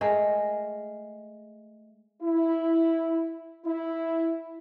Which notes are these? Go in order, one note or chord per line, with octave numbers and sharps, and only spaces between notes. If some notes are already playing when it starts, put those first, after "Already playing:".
G#3 A3 A#4
E4
E4